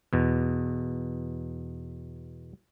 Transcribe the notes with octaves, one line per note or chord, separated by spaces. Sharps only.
E2 B2